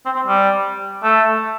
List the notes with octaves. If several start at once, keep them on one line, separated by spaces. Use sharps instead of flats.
C4
C4
G3
A3